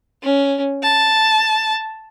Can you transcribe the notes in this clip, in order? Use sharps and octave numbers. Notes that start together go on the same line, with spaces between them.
C#4
A5